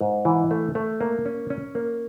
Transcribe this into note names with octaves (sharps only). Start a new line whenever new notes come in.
G#2
E3
A3
A3
A#3
C#4
C#4
A#3